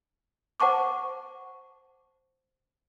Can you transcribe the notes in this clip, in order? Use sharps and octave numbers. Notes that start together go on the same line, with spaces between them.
C5 F#5 A5 C#6 D6